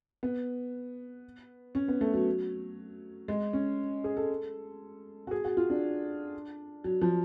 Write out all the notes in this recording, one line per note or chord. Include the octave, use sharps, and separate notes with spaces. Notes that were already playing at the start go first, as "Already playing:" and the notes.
B3
C#4
B3
A3
F#3
G#3
C#4
G#4
A4
F#4
G#4
F#4
F4
D4
F#3
F3